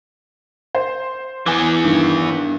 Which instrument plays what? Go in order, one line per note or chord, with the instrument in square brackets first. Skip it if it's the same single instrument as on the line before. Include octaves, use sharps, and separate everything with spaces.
[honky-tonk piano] C5
[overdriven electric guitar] E3 B3 [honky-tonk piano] G#5 D6
[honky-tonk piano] G2 D#3